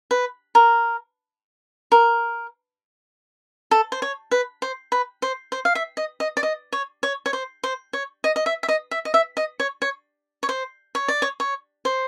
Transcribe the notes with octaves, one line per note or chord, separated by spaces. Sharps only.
B4
A#4
A#4
A4
C5
C#5
B4
C5
B4
C5
C5
F5
E5
D#5
D#5
D5
D#5
C#5
C#5
C#5
C5
C5
C#5
D#5
D#5
E5
E5
D#5
E5
D#5
E5
D#5
C#5
C#5
C#5
C5
C#5
D5
C#5
C#5
C5